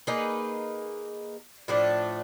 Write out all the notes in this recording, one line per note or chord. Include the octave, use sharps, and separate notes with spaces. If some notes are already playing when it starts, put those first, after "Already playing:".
A#3 D#4 G#4 B4
A2 F3 A3 D4